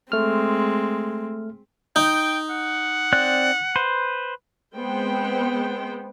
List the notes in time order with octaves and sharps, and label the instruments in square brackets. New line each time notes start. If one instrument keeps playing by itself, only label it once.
[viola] G#3 C4 [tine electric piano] A3 F6
[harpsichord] D#4 [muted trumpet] G5
[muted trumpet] F#5
[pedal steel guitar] C4 D5 F#6
B4 C5
[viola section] G#3 B3 C4 C5 G5